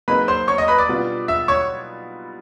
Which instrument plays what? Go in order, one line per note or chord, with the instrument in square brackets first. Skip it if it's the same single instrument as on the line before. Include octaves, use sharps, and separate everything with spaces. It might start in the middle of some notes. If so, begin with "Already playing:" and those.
[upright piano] F#3 A#3 D#4 G#4 [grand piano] B4 B5
[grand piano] C5 C6
C#5 C#6
D#5 D#6
B4 B5
D5 D6
[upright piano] B2 G3 B3 D4 F4
[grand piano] E5 E6
C#5 C#6